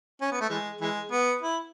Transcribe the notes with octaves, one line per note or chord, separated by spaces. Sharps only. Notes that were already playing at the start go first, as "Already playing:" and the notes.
C#4
B3
A3
E3 G#3
E3 G#3
B3
E4